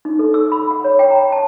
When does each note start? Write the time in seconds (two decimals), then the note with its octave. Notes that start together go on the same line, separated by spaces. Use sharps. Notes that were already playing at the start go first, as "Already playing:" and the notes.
0.05 D#4
0.19 A4
0.34 E6
0.52 B5
0.71 F#5
0.84 C#5
0.99 G5
1.11 A#5
1.32 A5